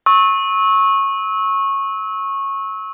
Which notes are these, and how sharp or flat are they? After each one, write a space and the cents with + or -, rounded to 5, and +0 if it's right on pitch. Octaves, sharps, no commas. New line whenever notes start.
C#6 -20 E6 -30